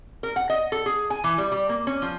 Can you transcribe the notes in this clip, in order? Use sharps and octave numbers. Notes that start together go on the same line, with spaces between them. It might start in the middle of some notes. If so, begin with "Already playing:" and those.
A#4
F#5
D#5
A4
G#4
G#5
E3
G3
G3
A#3
C#4
F3